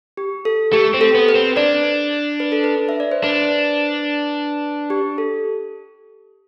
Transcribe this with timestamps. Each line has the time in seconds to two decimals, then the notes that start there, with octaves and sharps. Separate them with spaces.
0.17 G4
0.45 A4
0.73 A3 G4
0.94 C4
1.01 A4
1.15 B3
1.29 B4
1.35 C4
1.57 D4 D5
2.40 B4
2.52 A4
2.64 B4
2.89 E5
3.00 D5
3.12 C5
3.23 D4 B4
4.90 G4
5.18 A4